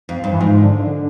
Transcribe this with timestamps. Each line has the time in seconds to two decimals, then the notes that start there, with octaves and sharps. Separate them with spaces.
0.09 F2
0.24 G2
0.33 E3
0.40 G#2 F3
0.63 D3
0.87 D3